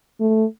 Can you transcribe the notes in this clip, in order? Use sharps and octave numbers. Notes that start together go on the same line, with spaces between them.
A3